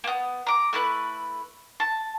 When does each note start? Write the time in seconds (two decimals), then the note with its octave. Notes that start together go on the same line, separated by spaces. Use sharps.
0.04 A#3 B3
0.47 A#5 D6
0.73 A3 E4 B4 F#6
1.80 A5